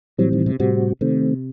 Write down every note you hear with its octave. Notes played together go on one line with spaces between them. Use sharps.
A2 E3 F#3 G3 C4
D#3
C3
A2 C3 G3 C4 F#4
C3 D#3 A3 C4